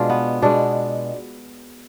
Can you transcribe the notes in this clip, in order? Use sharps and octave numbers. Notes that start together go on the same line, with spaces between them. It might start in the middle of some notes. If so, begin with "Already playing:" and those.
Already playing: B2 G#3 D4 F4
B3
B2 G#3 D4